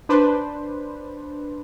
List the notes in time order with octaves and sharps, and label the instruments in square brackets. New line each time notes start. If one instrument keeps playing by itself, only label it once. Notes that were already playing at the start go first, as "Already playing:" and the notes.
[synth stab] D4 B4 C5